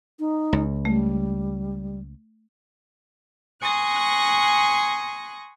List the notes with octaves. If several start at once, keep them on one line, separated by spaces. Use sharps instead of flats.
D#4
C#2
G3 A3
G#5 C6 C#6 D#6 F#6 A#6